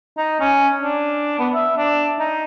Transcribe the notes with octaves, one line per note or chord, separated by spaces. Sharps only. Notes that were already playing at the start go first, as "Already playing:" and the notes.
D#4
C#4
D4
B3
E5
D4
D#4